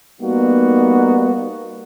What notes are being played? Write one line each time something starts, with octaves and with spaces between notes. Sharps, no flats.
G3 A#3 B3 D#4 F#4